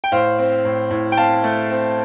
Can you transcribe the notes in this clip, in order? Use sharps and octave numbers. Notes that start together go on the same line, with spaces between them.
G5
A2 C5 F5
C4
A2
A2
G5
C4 F5 A5
A3
C4